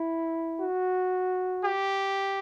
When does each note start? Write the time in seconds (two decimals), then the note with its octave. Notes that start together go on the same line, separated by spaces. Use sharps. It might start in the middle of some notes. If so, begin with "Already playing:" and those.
Already playing: E4
0.60 F#4
1.64 G4